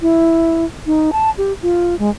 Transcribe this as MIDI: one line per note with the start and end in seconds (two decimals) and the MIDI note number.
0.02 0.65 64
0.86 1.11 63
1.13 1.30 81
1.38 1.53 67
1.62 1.98 65
1.99 2.10 56